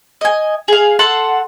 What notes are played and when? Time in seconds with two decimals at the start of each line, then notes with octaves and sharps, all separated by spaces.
0.21 D#5 G#5
0.68 G#4 F5
0.99 A4 F#5 A5 C6